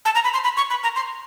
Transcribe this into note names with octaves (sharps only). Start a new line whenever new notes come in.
A5
A#5
B5
C6
B5
C#6
B5
A#5
C6